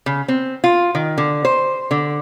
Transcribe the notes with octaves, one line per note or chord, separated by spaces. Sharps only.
C#3
C4
F4
D#3
D3
C5
D3